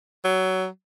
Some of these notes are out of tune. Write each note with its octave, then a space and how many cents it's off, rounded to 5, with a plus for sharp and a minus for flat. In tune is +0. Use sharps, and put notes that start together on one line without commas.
F#3 +20